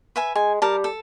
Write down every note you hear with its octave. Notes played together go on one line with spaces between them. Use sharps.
B4 E5 G#5
G#3 G#5
G3 A#4 A5
A4